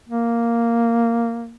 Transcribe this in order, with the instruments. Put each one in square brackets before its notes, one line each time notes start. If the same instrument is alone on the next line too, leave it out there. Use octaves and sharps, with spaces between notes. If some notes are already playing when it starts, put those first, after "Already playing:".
[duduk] A#3